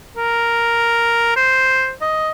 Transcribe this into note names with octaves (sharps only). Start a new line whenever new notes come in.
A#4
C5
D#5